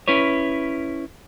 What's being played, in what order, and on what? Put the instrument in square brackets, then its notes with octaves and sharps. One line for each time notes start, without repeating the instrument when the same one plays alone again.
[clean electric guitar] C#4 E4 B4 C#5